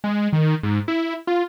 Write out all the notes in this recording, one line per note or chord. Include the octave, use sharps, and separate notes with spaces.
G#3
D#3
G#2
E4
F4